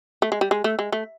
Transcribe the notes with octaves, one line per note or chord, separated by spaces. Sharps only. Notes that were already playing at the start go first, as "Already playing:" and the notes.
A3
G#3
G3
G#3
A3
G#3
A3